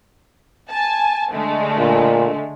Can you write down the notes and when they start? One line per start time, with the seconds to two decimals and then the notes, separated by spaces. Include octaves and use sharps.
0.70 G#5 A5
1.30 D3 G#3 A3
1.79 A#2